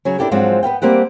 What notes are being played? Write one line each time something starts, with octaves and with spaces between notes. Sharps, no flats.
C#3 F#3 C#4
D4 E4 F4 G4 A4 A#4
G#2 F3 F#3 G#3 C4 D4
B3 B4 F5 G5
G3 A#3 C4 G4 F#5